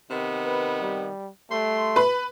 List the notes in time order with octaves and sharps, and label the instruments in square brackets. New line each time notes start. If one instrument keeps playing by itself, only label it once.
[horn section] C3 D#3 B3
[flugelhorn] B4
G3
[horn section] G3 C6 [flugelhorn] A3
[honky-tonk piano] B4 B5